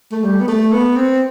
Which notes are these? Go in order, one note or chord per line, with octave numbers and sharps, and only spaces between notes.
A3
G3
B3
A3
B3
C4